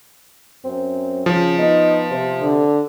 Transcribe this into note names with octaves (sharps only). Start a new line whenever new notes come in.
F#2 C4
C#3 F3
B3 D#4
C3
D3